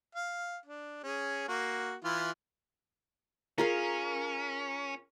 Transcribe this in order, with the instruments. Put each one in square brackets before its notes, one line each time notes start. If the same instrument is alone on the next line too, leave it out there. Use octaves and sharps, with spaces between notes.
[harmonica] F5
D4
C#4 G#4
A#3 F#4
E3 E4 F4
[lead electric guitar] C#4 [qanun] F4 G#4 F5 [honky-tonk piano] A#4